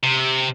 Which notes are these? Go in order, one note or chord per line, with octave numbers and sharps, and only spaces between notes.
C3